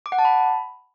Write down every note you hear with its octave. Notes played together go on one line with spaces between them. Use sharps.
D6
F#5
A5
B5